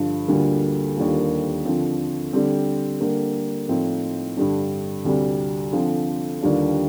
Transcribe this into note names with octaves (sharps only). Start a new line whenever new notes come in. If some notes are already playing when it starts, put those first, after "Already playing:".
Already playing: G2 D3 F3
D2 D3 G3 A#3 F4
D#2 D3 G3 A#3 F4
D3 F3 C4 F4
D3 G3 C4
D3 G3 A#3
A2 F3 C4 D#4
G2 D3 G3 D4
D2 C3 G3
D3 F3 C4
D#2 D3 G3 D4 F4